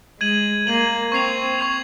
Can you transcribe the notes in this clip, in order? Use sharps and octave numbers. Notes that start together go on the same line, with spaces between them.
G#3 G#6 D#7 F#7
A#3 G#6 D#7 F#7
C4 C#6 G#6 C7 F7
C#6 G#6 C7 F7